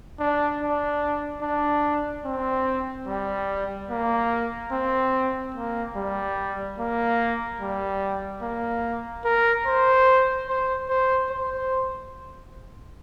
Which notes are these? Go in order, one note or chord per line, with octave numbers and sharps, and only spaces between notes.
D4
D4
D4
C4
G3
A#3
C4
A#3
G3
A#3
G3
A#3
A#4
C5
C5
C5
C5